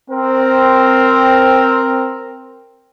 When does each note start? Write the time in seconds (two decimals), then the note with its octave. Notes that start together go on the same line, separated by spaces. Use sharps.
0.11 C4 A#4